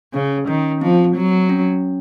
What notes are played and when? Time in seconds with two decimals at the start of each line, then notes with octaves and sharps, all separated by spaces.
0.14 C#3 C#4
0.48 D#3 C#4
0.81 F3 C4
1.16 F#3
1.49 C#4